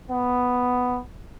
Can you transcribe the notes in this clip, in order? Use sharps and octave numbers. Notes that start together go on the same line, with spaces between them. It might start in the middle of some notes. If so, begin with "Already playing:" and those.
B3